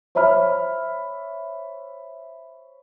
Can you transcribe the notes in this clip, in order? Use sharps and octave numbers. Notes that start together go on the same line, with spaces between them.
C5 C#5 E5 B5 F6